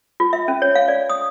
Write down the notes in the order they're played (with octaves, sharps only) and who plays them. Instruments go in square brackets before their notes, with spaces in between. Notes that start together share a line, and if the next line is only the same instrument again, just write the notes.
[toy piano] F4
E5
C#4
C#5
F5
D5
D#6